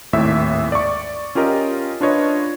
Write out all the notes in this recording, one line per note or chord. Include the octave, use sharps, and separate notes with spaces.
G#1 D#2 A2 E5
D5 C#6
C#4 F4 G4 A#4 D#5
D4 F4 B4 C#5 D#5